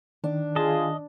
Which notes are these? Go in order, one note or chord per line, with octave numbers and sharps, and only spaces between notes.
D#3 D4
F4 G#4 D#5 A5